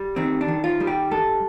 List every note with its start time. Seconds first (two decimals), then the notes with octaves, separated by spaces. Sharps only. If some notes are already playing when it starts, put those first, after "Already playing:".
Already playing: G3
0.16 D#3 C4
0.41 D4
0.48 D#3
0.64 F4
0.80 G3
0.87 G4
1.11 G2 A4